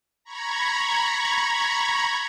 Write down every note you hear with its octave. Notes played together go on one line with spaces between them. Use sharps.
A#5 B5 C#6 G#6